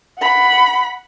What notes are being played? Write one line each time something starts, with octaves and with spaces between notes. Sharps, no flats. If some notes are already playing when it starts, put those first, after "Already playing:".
F#5 B5